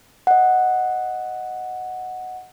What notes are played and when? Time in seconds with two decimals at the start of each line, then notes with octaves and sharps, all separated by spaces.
0.27 D#5 F#5